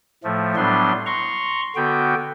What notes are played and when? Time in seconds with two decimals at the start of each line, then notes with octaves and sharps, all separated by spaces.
0.24 A2 F3 A3
0.56 A2 F#3 G3 B3 D4 C6
1.06 A#5 C6 C#6
1.76 D3 B3 F#4 G5